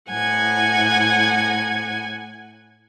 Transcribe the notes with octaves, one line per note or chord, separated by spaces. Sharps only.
A2 F#5 G#5 G#6